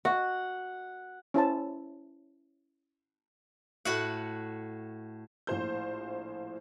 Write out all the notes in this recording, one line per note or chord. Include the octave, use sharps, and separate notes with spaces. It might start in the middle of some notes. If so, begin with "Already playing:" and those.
F#4 F#5
C#4 E4 C5 A5
A2 F#4 F#5
A#1 A2 C5 G6